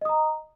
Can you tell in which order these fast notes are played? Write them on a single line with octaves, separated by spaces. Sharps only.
D#5 D#6 A#5